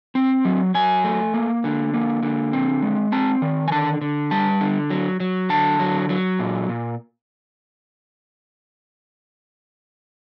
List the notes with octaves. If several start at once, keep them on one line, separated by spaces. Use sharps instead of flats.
C4
F#3
F#3 G#5
A3
A#3
D3
A#3
D3
C4
G#3
C4 A5
D#3
G#5
D3 A5
D3
G3 A5
D3
F#3
F#3
D3 A5
F#3
F#3
A#2
A#2